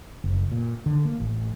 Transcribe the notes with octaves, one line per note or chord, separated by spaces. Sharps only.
F#1
A#2
D3
A#3
A1